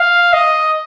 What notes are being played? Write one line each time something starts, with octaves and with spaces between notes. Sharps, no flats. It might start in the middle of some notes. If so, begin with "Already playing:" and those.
Already playing: F5
D#5